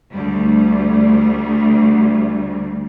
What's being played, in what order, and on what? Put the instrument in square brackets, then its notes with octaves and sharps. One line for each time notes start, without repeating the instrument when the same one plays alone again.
[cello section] D2 G3